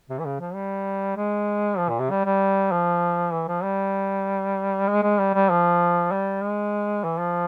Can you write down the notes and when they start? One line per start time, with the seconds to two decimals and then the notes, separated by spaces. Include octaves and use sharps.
0.10 C3
0.19 E3
0.25 C#3
0.40 F3
0.55 G3
1.17 G#3
1.78 F3
1.89 A#2
2.00 C3
2.11 G3
2.26 G3
2.72 F3
3.33 E3
3.48 F3
3.64 G3
4.88 G#3
5.03 G#3
5.19 G3
5.35 G3
5.50 F3
6.12 G3
6.43 G#3
7.04 E3
7.20 F3